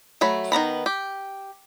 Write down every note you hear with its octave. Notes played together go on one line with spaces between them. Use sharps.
F#3 A3 B5
D#3 B3 A#5 B5
G4